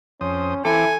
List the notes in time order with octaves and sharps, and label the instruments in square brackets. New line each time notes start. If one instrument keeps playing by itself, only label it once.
[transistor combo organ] F2 C5 D#6 [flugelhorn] C#4
[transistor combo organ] E3 C4 D6 [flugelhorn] E4 [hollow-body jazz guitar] A4 [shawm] G#5